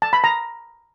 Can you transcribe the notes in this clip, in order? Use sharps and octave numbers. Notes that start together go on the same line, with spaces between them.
A5
B5
A#5